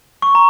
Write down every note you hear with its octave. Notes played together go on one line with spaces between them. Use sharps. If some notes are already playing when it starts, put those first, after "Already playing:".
C#6
A#5